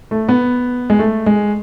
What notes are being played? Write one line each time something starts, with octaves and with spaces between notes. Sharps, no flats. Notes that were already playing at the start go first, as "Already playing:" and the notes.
A3
B3
G#3
A3
G#3